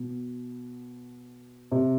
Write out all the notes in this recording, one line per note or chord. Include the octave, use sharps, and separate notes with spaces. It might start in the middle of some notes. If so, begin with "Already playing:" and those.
Already playing: B2
C3